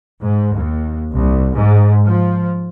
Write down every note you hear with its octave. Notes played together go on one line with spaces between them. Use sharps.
G#2
D#2
C2
G#2
F3